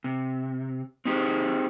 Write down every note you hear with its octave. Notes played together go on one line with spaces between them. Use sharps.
C3
C4 D#4 G4 G#4 C5